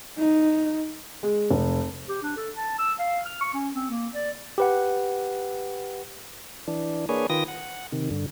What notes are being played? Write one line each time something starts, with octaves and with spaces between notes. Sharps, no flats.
D#4
G#3
F1
G4
D4
A4
A5
E6
F5
F6
C#6
C#4
C4
A#3
D5
G4 B4 F#5
E3 D4
A#3 D4 G#4 B4 C#5 G#5
D#3 F4 B4 G5 D#6 A#6
F#5
C3 D#3
G2 D3